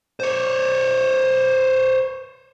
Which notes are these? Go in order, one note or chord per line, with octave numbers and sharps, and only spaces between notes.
C5 C#5